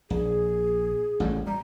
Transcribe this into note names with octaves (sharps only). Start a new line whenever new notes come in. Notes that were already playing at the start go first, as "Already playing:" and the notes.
A#1 G#4
A1 A2 G3
G3 A#5